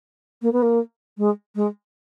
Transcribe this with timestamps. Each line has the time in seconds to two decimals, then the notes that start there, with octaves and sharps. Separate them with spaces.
0.42 A#3
0.52 B3
0.62 A#3
1.18 G#3
1.55 G#3